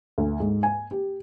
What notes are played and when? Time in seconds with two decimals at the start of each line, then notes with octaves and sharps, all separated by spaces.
0.18 D2
0.40 G#2
0.63 G#5
0.91 G4